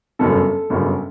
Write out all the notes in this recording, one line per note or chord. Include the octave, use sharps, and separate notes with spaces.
G1 F#2 C#3 A4
G1 F#2 C#3